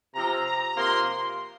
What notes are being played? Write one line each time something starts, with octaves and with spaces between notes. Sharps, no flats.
C3 F3 C4 A#5
A#5
C3 F3 A#3 C6